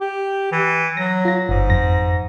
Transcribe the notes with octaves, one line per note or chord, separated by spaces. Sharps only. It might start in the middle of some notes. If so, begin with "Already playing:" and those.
G4
E3
F#3 A#6
F4 A#6
G1 G#2
F2 A#6